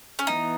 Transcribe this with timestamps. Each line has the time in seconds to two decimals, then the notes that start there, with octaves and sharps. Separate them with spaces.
0.19 C#4
0.27 E3 B3 D#4